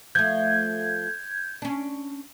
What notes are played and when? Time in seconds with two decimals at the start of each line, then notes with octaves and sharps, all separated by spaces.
0.15 F3 A3 G6 G#6
1.62 C#4 D4